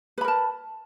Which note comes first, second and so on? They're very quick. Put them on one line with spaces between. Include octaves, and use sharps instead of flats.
B4 B5 A#4 A5